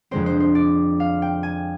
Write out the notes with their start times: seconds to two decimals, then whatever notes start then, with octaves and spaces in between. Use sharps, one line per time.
0.11 F2 D3 G#3 C4 C5
0.26 C5
0.40 C5
0.55 D5
1.00 F5
1.22 G5
1.43 G#5